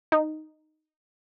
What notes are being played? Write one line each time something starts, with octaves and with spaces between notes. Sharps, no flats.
D#4